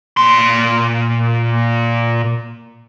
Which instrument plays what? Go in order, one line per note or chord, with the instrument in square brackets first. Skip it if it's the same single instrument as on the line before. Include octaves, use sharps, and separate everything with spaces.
[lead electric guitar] A#2 C6